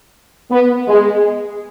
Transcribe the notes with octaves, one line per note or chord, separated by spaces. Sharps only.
B3
G#3